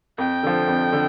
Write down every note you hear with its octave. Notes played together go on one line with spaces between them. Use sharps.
F2 G5
D3 F3
F2
D3